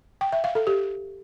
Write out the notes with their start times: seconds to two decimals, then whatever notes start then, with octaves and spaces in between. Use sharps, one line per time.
0.21 G5
0.32 E5
0.44 F5
0.55 A4
0.67 G4